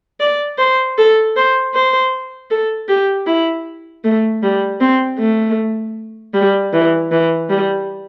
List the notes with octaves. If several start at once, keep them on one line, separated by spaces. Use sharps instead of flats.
D5
C5
A4
C5
C5
A4
G4
E4
A3
G3
C4
A3
G3
E3
E3
G3